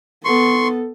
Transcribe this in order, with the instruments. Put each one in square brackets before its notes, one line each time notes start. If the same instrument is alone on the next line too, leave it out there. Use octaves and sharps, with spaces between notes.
[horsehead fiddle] B3 A4 [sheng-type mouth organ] C6 C#6